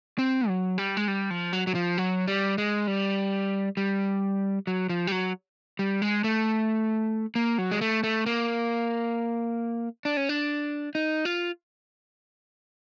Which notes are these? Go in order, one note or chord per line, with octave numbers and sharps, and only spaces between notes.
C4
F#3
G3
G#3
G3
F3
F#3
F#3
F3
F#3
G3
G#3
G3
G3
F#3
F3
G3
F#3
G3
G#3
A3
A#3
F#3
G#3
A3
A3
A#3
D4
C#4
D4
D#4
F4